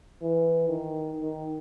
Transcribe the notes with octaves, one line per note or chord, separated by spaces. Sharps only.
E3
D#3
D#3